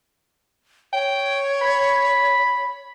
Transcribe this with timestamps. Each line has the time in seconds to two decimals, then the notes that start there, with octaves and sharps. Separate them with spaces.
0.93 C#5 G5
1.62 B5